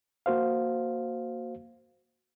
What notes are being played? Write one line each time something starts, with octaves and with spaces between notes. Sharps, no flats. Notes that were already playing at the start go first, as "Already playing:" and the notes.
A#3 F#4 C5 F5